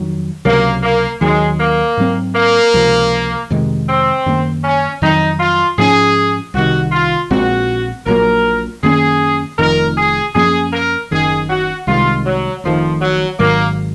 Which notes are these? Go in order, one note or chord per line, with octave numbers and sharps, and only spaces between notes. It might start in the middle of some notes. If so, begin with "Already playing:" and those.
Already playing: F2 D#3 F#3
C#2 C3 F#3 A#3
A#3
D#2 D#3 F#3 G#3
A#3
G#2 F#3 C4
A#3
C#2 C3 F3
F2 C3 D#3 G#3
C4
F#2 D#3 A#3
C#4
F2 D#3 F#3 D#4
F4
G#2 F3 A#3 C#4 G#4
C2 C3 D#3 F#4
F4
A#1 A#2 G#3 C4 F#4
A#1 A#2 F#3 A#3 A#4
F#2 D#3 A#3 C#4 G#4
F1 F2 D#3 A#4
G#4
F#2 F3 A#3 C#4 G#4
A#4
F#1 F#2 D#3 G#4
F#4
C2 C3 D#3 G#3 F4
F#3
F1 F2 D#3 F3
F#3
G#1 G#2 D#3 F#3 A#3